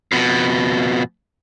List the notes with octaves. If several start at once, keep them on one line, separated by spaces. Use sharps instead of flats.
F2 B2